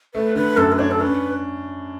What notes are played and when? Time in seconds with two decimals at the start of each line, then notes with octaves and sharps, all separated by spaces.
0.14 A3 B4
0.35 D3 B4
0.57 F#2 A4
0.72 B4
0.79 D4 C#5
0.91 A4
1.00 C#4 B4